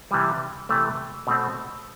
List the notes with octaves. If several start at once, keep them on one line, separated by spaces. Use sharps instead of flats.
C3 E3 G3
C3 E3 A3
B2 A3 C4